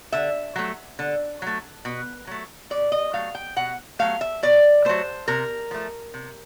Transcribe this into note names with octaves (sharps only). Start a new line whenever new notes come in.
D3 E5
F#3 A3
D3
F#3 A3
B2
F#3 A3
B2 D5
D#5
F#3 A3 F5
G5
B2 F#5
F#3 A3 F5
E5
B2 D5
F#3 A3 C5
C3 A#4
F3 A3
C3